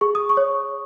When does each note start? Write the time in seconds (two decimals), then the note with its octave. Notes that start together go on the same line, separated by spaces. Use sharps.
0.01 G#4 C#6
0.15 D#6
0.29 C#6
0.37 C#5